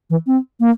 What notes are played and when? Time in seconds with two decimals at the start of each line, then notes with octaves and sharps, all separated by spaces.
0.10 E3
0.27 C4
0.60 A#3